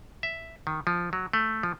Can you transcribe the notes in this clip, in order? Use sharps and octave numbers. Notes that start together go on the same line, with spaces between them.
E5
D#3
F3
F#3
A3
F3